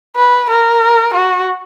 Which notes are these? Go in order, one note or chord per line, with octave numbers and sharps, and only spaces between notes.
B4
A#4
F#4